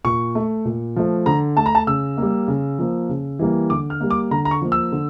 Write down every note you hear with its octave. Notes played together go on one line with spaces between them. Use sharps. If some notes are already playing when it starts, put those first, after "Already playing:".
A#2 C#6
A3
A#2
F3 A3
D3 A#5
A3 A5
A#5
A5
C#3 E6
G3 A#3
C#3
F3 A#3
C#3
E3 G3 A#3
D3 D6
F6
G3 A#3
D6
D3 A#5
A#5
C#6
F3 A#3
E6
D3